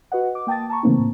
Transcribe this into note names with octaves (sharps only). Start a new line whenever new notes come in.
F#4 B4 D#5 F#5
D6
A#3 G5 A5 D#6 A6
A5 A#5 C#6
C#3 E3 A3 A#3 C4 D#4
A2